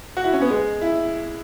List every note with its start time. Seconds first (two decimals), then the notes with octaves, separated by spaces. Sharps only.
0.17 F#4
0.24 E4
0.33 C#4
0.41 B3
0.50 G#3
0.81 E4